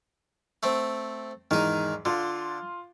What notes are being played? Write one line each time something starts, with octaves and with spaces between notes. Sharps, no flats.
A3 C4
E2 G#2 D#3 D#4
D3 F4 C6